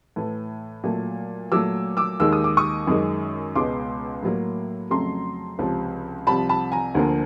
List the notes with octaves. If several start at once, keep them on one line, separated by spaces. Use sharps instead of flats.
A2 E3 A3
A#2 F#3 A3
A#2 F#3 A3 D6 E6
D6 E6
D#2 D#3 G#3 E6
D#6
D6
C#6 D#6
F#2 D#3 G#3
C#2 B2 G#3 C6 D6
A2 F#3 A#3
F2 C#3 F#3 A3 A#5 C6
C#2 C3 F3
C2 C3 F3 A5 B5
A5 B5
G#5 A#5
D2 D3 F3 A#3